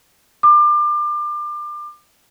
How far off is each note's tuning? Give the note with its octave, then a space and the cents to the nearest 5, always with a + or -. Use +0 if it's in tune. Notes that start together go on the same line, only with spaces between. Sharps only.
D6 +30